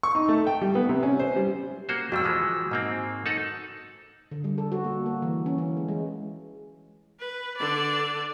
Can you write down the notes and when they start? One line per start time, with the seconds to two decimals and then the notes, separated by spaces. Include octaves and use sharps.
0.03 C#6
0.15 D#4
0.29 A3
0.47 G5
0.62 G3
0.75 B3
0.89 C3
1.03 C#4
1.19 C5
1.36 G3
1.89 A#3 F#4 C5
2.12 F2 G3 F#4 E6
2.24 E3 F3 G#3
2.71 G#2 A#3 C4
3.26 D#4 A4 F#5
4.31 D3
4.44 G3
4.58 A4
4.72 F#4
4.84 A#3
5.06 A#3
5.22 E3
5.46 C#4
5.58 E3
5.77 G#3
5.88 G#3
7.19 B4
7.57 D3 D5